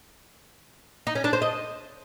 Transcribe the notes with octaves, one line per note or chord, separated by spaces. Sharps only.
D#4
C#4
D4
C5
D#5